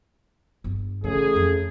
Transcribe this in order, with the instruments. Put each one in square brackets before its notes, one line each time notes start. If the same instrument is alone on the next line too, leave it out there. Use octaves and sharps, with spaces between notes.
[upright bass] G1
[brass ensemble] A1 G#4 [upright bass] C#3 A3
[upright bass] F2 D#3